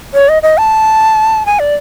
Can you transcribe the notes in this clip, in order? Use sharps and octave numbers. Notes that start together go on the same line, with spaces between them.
C#5
D#5
D#5
A5
G#5
D5